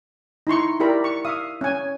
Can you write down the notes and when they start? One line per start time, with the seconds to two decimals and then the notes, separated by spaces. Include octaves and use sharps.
0.47 D#4 E4 C6 C#6
0.80 E4 G4 A#4 D5 B5
1.04 C#6
1.25 E5 F5 D#6
1.61 C#4 G#5